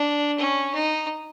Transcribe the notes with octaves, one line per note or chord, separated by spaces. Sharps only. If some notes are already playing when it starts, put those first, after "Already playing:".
Already playing: D4
C#4
D#4